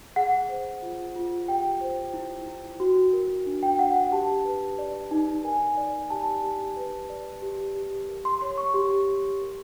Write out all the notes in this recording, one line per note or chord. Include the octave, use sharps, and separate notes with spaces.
G#4 F#5
C5
F4
F4
G4 G5
C5
E4
E4
F#4
A#4
D4
G5
D4 F#5
F#5
G4 A5
B4
D5
D#4
A#4 G#5
D5
G4 A5
G4
B4
D5
G4
G4
A#4
C6
C#5 C6
C#6
G4 C6
G4
A#4